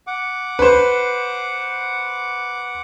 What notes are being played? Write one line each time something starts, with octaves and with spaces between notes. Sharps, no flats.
F#5 D6
B4 C5